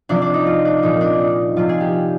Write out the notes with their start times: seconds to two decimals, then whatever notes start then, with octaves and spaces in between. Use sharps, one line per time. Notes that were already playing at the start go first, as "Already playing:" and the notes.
0.09 C3 F3 D4
0.22 D4
0.34 D#4
0.46 F4
0.65 D4
0.83 A#2 F3 D#4
1.01 D4
1.19 D#4
1.56 C3 F3 F4
1.69 G#4
1.80 G4